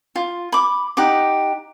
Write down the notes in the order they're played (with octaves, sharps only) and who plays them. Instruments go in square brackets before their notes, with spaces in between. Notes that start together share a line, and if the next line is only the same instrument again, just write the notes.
[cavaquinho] F4
B5 D6
D#4 G4 F#5 D6